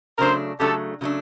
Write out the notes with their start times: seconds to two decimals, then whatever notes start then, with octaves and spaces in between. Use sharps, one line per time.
0.18 C#3 F#3 A3 D4 A#4 C5
0.60 C#3 F#3 A3 D4 G4 A4
1.01 C#3 F#3 A3 D4